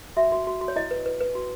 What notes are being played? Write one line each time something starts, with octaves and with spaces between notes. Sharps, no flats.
F#4 E5
F#4
F#4
F#4
C#5
E4 D#5
B4
B4
B4
F#4